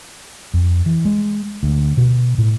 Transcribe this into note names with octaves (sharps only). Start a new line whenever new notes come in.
F2
E3
G#3
D2
B2
A2